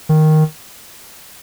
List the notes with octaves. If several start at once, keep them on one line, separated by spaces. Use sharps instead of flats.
D#3